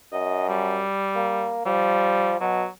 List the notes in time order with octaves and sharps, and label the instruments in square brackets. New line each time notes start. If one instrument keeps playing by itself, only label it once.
[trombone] F#2 [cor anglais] D#5
[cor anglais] G3
[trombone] A#3
[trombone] F3 [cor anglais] G3
[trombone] B2 [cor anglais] F#3